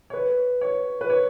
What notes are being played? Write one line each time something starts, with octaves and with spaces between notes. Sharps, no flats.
C#5
B4
C#5
B4
C#5